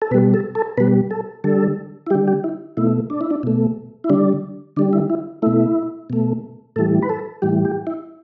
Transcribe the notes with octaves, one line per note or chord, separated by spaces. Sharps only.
A4
B2 G3 B4
A4
A4
B2 G3 B4
A4
D3 G3 A4
E4
D3 G3 G4
G4
E4
B2 A3 E4
D4
E4
D4
B2 A3
E4
D3 G3 D4
D3 G3 D4
E4
E4
B2 A3 E4
B2 A3
A2 E3 G3 A4
B4
A4
A2 E3 G3 G4
G4
E4